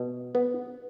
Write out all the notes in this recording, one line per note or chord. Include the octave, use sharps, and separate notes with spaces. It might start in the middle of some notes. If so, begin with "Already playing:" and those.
Already playing: B2
B3